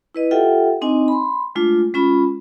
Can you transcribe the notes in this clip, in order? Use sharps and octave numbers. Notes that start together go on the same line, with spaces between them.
E4 B4 D#5
F4 G4 A4 E5 F#5 G5
C4 D4 D#4 D#5 G#5
B5 C6
G#3 A3 D4 F4
G#3 C#4 F4 B5